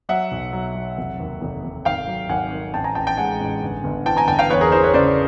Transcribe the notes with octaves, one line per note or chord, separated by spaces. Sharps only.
F#3 E5 F#5
B1
F#3
F#3
F1
D#2
F1
F1
G#1 F5 G5
F#3
G#1 F#5 G#5
G#1
A1 G5 A5
G#5 A#5
A1 G5 A5
G5 A5
G#3 F#5 G#5
A1
G1
G1
E3 G5 A5
G#5 A#5
G1 G5 A5
F5 G5
E2 B4 C#5
G#4 A#4
E3 A#4 C5
B4 C#5
C#3 C5 D5